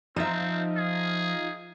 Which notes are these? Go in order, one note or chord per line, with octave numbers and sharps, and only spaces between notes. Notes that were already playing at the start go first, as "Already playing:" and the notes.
F3 C4 D#4 F4 E5
G#4